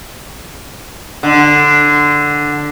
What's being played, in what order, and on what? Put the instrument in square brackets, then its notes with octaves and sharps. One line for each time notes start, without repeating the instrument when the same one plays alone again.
[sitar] D3